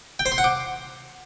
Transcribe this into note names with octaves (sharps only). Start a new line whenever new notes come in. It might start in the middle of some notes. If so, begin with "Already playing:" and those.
G5
C5
C6
F#5
D6